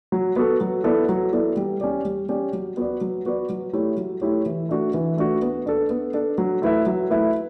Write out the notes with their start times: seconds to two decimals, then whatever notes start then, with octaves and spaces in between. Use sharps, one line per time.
0.12 F#3
0.36 B3 F#4 A4
0.61 F#3
0.84 B3 E4 A4 D5
1.09 F#3
1.33 B3 E4 A4 D5
1.56 G3
1.81 C#4 G4 D5
2.05 G3
2.29 C#4 G4 D5
2.53 F#3
2.77 B3 F#4 B4 D5
3.01 F#3
3.25 B3 F#4 B4 D5
3.49 F#3
3.73 A3 E4 G4 C#5
3.97 F#3
4.21 A3 E4 G4 C#5
4.46 E3
4.69 A3 D4 F#4
4.94 E3
5.18 A3 D4 F#4
5.42 B3
5.66 D4 A4
5.90 B3
6.14 D4 A4
6.38 F#3
6.62 A3 E4 B4 E5
6.86 F#3
7.10 A3 E4 B4 E5